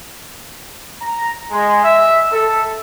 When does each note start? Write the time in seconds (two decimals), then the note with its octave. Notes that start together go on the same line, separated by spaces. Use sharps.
1.01 A#5
1.51 G#3
1.83 E5
2.32 A4